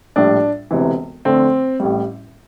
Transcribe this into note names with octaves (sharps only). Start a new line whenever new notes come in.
A#1 A2 G3 D4
E1 D2 C3 E3
F2 D3 A3 C4
A1 A2 G3